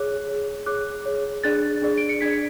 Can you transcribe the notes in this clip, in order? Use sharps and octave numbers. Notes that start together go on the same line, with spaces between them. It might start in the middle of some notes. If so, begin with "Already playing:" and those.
Already playing: G#4 C#5 D6 F#6
G#4 C#5
G#4 C#5 D6 F#6
G#4 C#5
D4 G#4 D5 F#6 A6
D4 G#4 D5
D7
C#7
D4 G#4 D5 G#6 B6